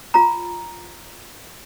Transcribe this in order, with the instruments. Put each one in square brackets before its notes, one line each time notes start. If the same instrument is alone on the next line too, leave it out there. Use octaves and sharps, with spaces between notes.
[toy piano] F4 A#5